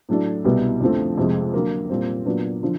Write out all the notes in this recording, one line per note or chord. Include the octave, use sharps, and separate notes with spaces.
A2 F#3 A3 D4
C2 B2 G3 B3 E4
F2 D3 F3 A3 C4
F2 C3 F3 G#3
D3 F#3 A#3
A#2 G3 C4
A#2 F#3 B3 D4
D3 F3